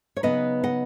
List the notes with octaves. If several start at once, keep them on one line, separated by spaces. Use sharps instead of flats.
C#5
C#3 F#3 B3 D#4 B4 D#5
D#5 F#5